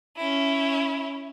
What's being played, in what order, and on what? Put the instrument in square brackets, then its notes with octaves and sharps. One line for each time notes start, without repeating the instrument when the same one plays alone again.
[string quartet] C#4 E4